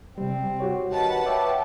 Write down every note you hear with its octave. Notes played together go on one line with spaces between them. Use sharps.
C3 G3 C4
F#4 G4 C#5
D#3 B4 F#5 A5
C#5 E5 G5 D6